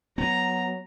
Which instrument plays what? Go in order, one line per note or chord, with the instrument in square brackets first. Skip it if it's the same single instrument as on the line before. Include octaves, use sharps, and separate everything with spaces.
[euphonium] F#3 [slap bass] B3 [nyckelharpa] A#5